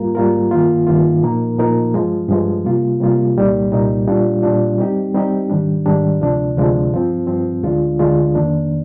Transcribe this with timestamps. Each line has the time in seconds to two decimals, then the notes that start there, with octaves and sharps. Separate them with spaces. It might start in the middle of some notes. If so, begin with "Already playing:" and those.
Already playing: G#2 G3 A#3 F4 A#4
0.15 G#2 G3 A#3 F4 A#4
0.51 G2 D#3 A#3 F4
0.87 G2 D#3 A#3 F4
1.22 A#2 F3 A#3 D#4 A#4
1.58 A#2 F3 A#3 D#4 A#4
1.94 G2 F3 G#3
2.29 G2 F3 G#3
2.65 C3 G3 A#3 F4
3.01 C3 G3 A#3 F4
3.35 C2 A#2 G3 A#3 D#4
3.71 C2 A#2 G3 A#3 D#4
4.07 A#2 G3 D4 F4
4.42 A#2 G3 D4 F4
4.78 G3 C4 D#4 G4
5.14 G3 C4 D#4 G4
5.49 G#2 D#3 G3 D4
5.86 G#2 D#3 G3 D4
6.21 D2 C3 F3 G#3 D4
6.57 D2 C3 F3 G#3 D4
6.92 G2 F3 C4
7.27 G2 F3 C4
7.63 D2 D3 G#3 D4 F4
7.99 D2 D3 G#3 D4 F4
8.35 F2 D#3 A#3 D4